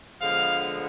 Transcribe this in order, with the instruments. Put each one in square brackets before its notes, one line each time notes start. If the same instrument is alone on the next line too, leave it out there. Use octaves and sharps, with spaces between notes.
[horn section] D3 F3 G#3 B3 F5